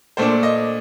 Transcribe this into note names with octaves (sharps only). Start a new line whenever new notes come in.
A#2 A3 D4 C5
D#5